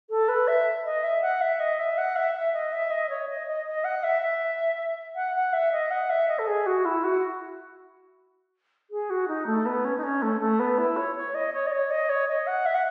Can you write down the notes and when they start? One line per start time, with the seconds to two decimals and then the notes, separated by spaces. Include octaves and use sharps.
0.10 A4
0.29 B4
0.48 E5
0.85 D#5
1.04 E5
1.22 F#5
1.41 E5
1.60 D#5
1.79 E5
1.98 F#5
2.16 E5
2.35 E5
2.53 D#5
2.72 E5
2.91 D#5
3.10 C#5
3.29 D#5
3.47 D#5
3.66 D#5
3.84 F#5
4.04 E5
4.22 E5
5.16 F#5
5.35 F#5
5.53 E5
5.72 D#5
5.91 F#5
6.10 E5
6.29 D#5
6.39 A4
6.47 G#4
6.66 F#4
6.85 E4
7.04 F#4
8.91 G#4
9.10 F#4
9.28 D#4
9.47 A3
9.66 B3
9.85 C#4
9.97 D#4
10.03 C#4
10.22 A3
10.41 A3
10.59 B3
10.78 E4
10.97 C#5
11.16 C#5
11.35 D#5
11.53 C#5
11.67 D#5
11.72 C#5
11.91 D#5
12.09 C#5
12.28 D#5
12.47 F#5
12.66 E5
12.74 F#5